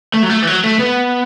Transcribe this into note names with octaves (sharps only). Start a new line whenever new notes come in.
A3
F#3
A3
E3
F#3
A3
B3